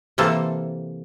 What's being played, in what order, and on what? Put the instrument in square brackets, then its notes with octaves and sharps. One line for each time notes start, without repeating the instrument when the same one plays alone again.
[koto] C3 E3 A#3 A4 C5